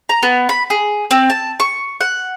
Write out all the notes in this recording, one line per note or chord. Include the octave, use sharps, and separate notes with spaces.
A#5
B3
B5
G#4
C4
A5
C#6
F#5